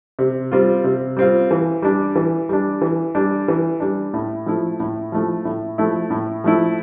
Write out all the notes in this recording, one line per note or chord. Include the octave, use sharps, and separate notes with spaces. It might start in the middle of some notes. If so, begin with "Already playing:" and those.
C3
G3 C4 F4
C3
G3 C4 F4
E3
G3 D4
E3
G3 D4
E3
G3 D4
E3
G3 D4
A2
F3 A3 E4
A2
F3 A3 E4
A2
F3 A3 E4
A2
F3 A3 E4